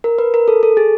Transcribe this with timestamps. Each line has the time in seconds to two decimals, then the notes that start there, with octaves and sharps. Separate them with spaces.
0.04 A#4
0.18 B4
0.34 A#4
0.48 A4
0.63 A4
0.77 G#4